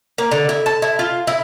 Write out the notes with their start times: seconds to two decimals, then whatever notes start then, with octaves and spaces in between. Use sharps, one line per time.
0.18 A#3
0.31 D3
0.49 E4
0.66 A5
0.82 E4
0.99 F4
1.27 E4